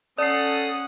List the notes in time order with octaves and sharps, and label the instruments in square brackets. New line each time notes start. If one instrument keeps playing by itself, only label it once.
[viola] C#4 F#5 [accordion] A4 [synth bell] D5 C7 [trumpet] D#6